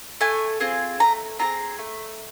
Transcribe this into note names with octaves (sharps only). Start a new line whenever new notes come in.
A3 G#5
C4 F4 G#4
A3 A#5
C4 F4 G#4 A#5
A3